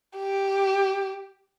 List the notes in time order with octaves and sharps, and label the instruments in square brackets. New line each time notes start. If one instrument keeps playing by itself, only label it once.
[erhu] G4